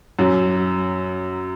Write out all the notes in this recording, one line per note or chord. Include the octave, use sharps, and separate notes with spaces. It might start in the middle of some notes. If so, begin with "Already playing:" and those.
F#2 F#3